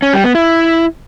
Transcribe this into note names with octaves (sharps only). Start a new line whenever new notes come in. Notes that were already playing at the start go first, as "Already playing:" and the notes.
C#4
G3
B3
E4